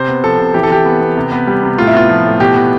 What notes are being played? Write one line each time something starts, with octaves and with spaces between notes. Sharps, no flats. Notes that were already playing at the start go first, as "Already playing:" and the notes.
Already playing: C3 C5
B3
F3 A4
C3
E3 G4
A4
E3 G4
B3
B3
C3
B3
G3
C3
A2 F4
E4
B3 F4
F3
A2
B2 G4
B3